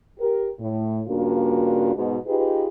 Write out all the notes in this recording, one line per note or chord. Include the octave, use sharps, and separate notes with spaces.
G4 A#4
A2
G2 C#3 A#3 D4 F4 F#4
G#2 B2
D#4 F4 G4 G#4 B4